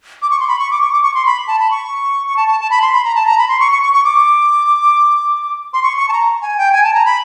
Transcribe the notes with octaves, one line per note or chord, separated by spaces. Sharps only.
D6
C#6
C6
B5
C#6
D6
C#6
D6
C#6
C6
B5
A5
B5
C#6
C#6
A5
A5
A5
B5
C6
B5
A#5
A5
A#5
B5
C6
C#6
C#6
C#6
C#6
D6
C6
C#6
C#6
A5
A#5
G#5
G5
G#5
A5
A#5
B5